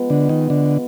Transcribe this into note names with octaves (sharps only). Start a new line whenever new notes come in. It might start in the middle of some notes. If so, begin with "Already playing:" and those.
Already playing: F3 G#3 B3
D3
D#3
D3